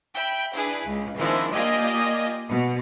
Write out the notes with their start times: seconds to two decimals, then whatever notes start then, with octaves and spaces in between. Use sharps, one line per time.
0.14 E5 G5 B5
0.55 D4 E4 G#4 B4
0.85 C#2
1.16 D#3 F3 G#3 C4 D4 E4
1.52 A#3 F4 G4 D5 D#5 G#5
2.50 B2